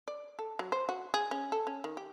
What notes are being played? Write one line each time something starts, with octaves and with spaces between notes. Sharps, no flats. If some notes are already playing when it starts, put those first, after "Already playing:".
D5
A4
F#3
C5
F#4
G#4
C#4
A4
C#4
D#3
G4